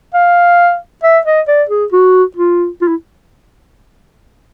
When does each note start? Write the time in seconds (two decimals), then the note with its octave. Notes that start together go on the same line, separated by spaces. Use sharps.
0.14 F5
1.03 E5
1.26 D#5
1.48 D5
1.69 G#4
1.93 F#4
2.36 F4
2.82 F4
2.88 E4